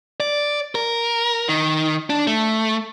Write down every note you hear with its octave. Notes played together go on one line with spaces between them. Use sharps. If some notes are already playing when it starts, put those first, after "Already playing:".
D5
A#4
D#3
D4
A3